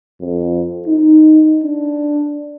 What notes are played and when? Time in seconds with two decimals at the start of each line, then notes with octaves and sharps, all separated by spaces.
0.21 F2
0.87 D#4
1.64 D4